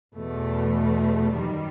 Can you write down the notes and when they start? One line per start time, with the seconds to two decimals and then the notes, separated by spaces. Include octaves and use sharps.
0.15 E2 B2 A3
1.37 F#2 D#3 G3